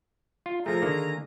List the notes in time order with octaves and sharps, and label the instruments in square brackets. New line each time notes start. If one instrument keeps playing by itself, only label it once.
[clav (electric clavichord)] F4
[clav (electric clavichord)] F3 A3 [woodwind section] G#4 G#5 A#5
[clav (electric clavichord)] D3 D#3 A#3